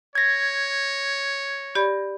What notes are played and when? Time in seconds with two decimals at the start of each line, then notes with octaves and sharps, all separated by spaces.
0.15 C#5 G#6 A#6
1.75 G4 D5 B5